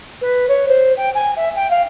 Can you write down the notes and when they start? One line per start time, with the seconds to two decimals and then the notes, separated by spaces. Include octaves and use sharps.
0.21 B4
0.48 C#5
0.68 C5
0.97 G5
1.15 G#5
1.36 E5
1.55 G5
1.70 F5